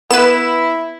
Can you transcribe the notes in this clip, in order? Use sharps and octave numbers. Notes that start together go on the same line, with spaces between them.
B3 E4 B4 E7